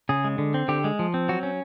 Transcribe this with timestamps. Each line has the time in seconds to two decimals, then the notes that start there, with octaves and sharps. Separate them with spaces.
0.09 C#3 G#4
0.24 G#3
0.38 D3
0.54 C4
0.68 D3 G4
0.84 G#3
0.99 F3
1.14 C4
1.28 F#3 F#4
1.43 C#4